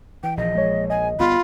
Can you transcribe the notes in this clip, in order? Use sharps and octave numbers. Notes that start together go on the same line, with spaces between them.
E3 G5
A#1 F3 D#5
G#3 C#5
D#5 G#5
G1 B3 F4 B5